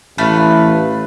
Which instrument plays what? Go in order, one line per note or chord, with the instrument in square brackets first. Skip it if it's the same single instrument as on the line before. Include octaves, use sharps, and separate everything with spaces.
[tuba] A1 [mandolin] A3 B4 F5